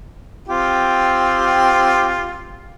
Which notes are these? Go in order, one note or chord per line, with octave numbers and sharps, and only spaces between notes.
C4 F4 G4